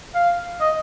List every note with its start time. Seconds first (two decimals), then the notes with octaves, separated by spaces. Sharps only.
0.15 F5
0.60 D#5